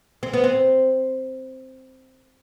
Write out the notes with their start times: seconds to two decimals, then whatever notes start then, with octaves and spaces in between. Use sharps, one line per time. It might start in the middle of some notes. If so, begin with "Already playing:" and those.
0.23 C4
0.33 B3
0.44 C4